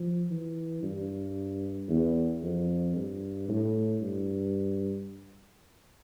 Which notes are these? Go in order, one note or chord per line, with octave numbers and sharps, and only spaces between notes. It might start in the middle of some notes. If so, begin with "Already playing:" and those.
Already playing: F3
E3
G2
E2
F2
G2
A2
G2